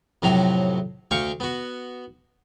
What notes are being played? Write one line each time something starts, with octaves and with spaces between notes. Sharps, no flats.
F2 A2 C3 F#3 A#5
D2 F5 G5 C#6
B3 F#4